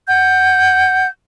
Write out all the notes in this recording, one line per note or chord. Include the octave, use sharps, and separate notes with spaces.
F#5 G6